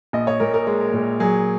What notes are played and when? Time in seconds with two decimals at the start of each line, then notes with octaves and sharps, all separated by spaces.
0.13 A#1 D#5
0.27 C#5
0.40 A#2 A#4
0.54 A#4
0.67 G#3
0.93 A#2
1.20 F#3 G#4